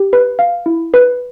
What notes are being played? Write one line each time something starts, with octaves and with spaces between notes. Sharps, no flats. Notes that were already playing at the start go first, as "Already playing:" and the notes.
Already playing: G4
B4
F5
E4
B4